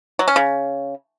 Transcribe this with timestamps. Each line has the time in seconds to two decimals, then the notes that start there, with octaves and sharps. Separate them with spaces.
0.19 F#3
0.28 C#4
0.36 C#3